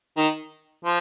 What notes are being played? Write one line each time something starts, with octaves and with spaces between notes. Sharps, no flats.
D#3
F3